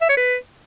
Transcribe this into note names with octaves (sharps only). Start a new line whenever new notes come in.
E5
C#5
B4